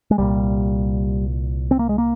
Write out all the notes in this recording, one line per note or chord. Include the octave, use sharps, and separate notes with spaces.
G#3
C2 A#2 G3
C4
A#3
G#3
A#3